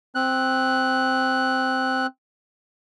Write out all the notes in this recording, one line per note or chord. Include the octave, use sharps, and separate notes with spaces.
C4 F#6